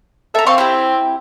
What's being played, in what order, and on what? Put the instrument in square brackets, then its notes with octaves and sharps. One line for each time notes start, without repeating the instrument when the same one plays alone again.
[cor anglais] A4 [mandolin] E5 A#5
[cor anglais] C4 [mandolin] F5 C6 C#6
[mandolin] E4 G4